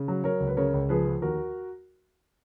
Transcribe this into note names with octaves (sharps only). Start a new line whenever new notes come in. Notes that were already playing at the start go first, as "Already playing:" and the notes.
Already playing: C#3
F#3
F#3 A#4 C#5
C#2
B4
C#3 A#4 C#5
C#2
F3 G#4 B4
F3
D#2 F#4 A#4